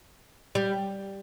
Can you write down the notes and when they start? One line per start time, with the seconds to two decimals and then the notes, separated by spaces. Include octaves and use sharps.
0.55 G3